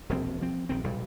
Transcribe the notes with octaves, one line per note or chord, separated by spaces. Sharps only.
E1 A#1 C4
F3 C4
A#1 D#3 C4
B1 A#2 G3